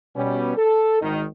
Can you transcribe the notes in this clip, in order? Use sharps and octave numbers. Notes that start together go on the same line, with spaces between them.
B2 G3 B3 C#4
A4
G#1 D#3 D#4